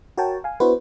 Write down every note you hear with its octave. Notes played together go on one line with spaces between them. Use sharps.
F#4 A#4 C#5 G5 A5
F5 G#5
B3 D4 E4 F#4 B4 C5